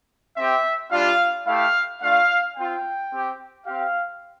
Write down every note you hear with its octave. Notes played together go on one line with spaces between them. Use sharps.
C4 G4 E5
G3 D4 F4 F5
A3 E4 G4 F5
A3 D4 F4 F5
C4 F4 G5
C4 G4
C4 G4 F5